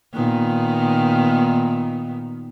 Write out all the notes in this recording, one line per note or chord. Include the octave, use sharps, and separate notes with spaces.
A#2 D#3 B3